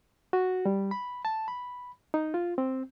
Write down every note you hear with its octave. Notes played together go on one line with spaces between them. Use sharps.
F#4
G3
B5
A5
B5
D#4
F4
C4